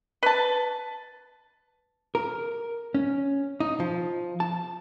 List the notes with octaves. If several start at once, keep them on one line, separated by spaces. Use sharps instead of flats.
B4 A5
A#4
C#4
D#4
F3
A5